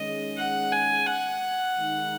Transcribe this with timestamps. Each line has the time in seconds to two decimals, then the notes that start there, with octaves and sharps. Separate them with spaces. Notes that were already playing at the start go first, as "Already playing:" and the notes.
Already playing: D#3 G#3 C#4 G#4 D#5
0.37 F#5
0.72 G#5
1.06 F#5
1.76 D#3 G#3 D#4